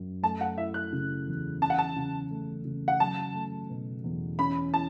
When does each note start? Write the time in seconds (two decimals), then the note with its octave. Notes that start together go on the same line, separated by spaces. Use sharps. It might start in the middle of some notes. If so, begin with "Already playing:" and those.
Already playing: F#2
0.23 A3 A5
0.41 F#5
0.58 E4 E5
0.74 F#6
0.93 C#3
1.27 E2
1.61 C#4 A5
1.70 F#5
1.78 A5
1.96 C#3
2.31 A3
2.65 C#3
2.88 F#5
3.00 F#3 A5
3.35 A3
3.69 B2
4.04 E2
4.39 C#4 B5
4.72 E4 A5